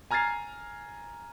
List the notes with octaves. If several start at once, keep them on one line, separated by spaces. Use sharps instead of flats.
G#5 A#5 F6 G#6 A6 C7